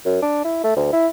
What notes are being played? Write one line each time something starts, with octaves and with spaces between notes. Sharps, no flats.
F#2
D4
E4
A3
D2
E4